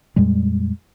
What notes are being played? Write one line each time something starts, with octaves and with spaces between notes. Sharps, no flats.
F2 A#2 G3 G#3